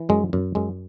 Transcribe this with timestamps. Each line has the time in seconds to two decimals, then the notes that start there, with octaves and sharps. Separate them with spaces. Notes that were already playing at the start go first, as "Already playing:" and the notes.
Already playing: E3
0.09 F#2 G#3
0.33 F#2
0.55 F#2 G#3